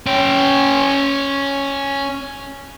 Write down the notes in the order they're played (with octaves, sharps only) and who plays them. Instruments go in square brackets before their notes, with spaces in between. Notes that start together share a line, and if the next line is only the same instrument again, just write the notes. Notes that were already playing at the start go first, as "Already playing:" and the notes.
[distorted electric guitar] C#4 G5